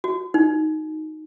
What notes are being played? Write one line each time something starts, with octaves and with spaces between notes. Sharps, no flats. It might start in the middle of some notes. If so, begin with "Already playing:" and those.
F#4
D#4